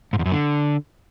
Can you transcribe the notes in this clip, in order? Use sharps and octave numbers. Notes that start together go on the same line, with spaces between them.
G#2
E2
F#2
D3